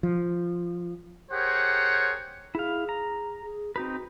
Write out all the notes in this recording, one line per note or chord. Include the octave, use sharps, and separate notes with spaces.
F3
G4 G#4 A#4 C5 C#5 F#5
E4 G#4 F5
A#5
G#4
C4 D#4 F#4 B4